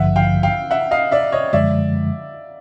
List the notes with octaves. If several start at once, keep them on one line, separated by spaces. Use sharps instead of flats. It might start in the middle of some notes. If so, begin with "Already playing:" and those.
Already playing: A1 G2 D3 F3 E5 F#5
F5 G5
F5 G5
E5 F#5
D#5 F5
D5 E5
C#5 D#5
F#2 D3 F3 G#3 D5 E5